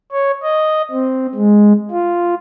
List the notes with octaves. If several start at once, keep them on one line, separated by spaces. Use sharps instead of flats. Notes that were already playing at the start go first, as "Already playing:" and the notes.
C#5
D#5
C4
G#3
F4